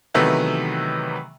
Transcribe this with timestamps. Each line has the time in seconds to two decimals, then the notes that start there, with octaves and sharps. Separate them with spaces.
0.14 C3 D#3 E3 F#3 A3 B3